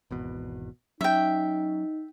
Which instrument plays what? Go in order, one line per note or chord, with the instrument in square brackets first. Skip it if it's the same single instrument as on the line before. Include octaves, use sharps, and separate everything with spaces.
[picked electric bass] G#1 E2 B2
[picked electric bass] F#3 C#4 [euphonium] D#4 [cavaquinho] E5 G5